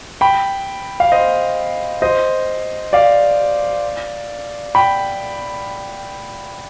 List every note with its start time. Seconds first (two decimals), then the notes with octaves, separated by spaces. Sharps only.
0.21 G5 B5
1.00 F5
1.12 C5 D#5
2.02 C5 D#5
2.93 D5 F5
4.75 G5 B5